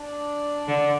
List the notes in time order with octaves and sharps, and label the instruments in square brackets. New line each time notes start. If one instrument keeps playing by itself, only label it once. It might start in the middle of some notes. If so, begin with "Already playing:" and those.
Already playing: [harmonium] D4 D5
[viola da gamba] D3